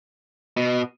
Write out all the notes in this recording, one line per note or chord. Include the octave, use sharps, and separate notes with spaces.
B2